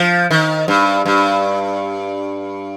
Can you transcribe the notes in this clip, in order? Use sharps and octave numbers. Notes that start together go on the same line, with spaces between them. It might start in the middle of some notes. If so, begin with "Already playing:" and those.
Already playing: F3
D#3
G2
G2